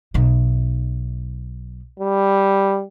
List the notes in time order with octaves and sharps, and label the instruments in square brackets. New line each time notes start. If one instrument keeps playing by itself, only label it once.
[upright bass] B1 D#4
[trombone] G3